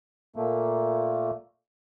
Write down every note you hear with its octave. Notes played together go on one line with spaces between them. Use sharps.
A#2 A3 A#3